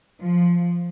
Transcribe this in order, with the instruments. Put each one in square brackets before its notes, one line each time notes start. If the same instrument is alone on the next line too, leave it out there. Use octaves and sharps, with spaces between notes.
[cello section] F3